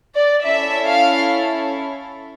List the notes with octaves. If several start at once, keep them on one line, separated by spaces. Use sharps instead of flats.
D5
C#4 E4 A4 E5
F5